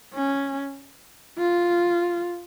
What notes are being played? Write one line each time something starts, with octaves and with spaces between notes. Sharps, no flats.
C#4
F4